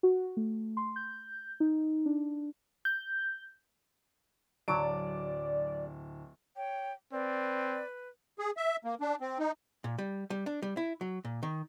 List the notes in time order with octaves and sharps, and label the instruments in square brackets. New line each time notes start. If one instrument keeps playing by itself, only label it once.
[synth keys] F#4
A3
C6
G6
D#4
D4
[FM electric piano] G6
[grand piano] D1 A5 D7 [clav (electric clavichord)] F#3 [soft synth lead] D5
[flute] C#5 [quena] G5
[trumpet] C4 [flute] B4 [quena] D5
[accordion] G#4
E5
A#3
D4
C4
D#4
[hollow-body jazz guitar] A#2
G3
G3
D4
G3
E4
F#3
A#2
D#3